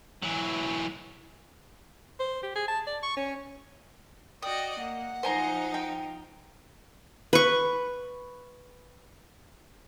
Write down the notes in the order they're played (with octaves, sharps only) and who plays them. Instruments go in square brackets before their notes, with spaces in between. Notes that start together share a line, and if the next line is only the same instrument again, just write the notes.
[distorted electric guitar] E3 F#3
[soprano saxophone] C5
G4
G#4
A5
D5
C#6
C#4
[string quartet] F#4 D5 D#5 [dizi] G5 [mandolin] D#6
[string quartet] A#3 [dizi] F#5
[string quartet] F3 D#4 [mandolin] C5 G#5 A#5
[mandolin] G5
[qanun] B4 C#6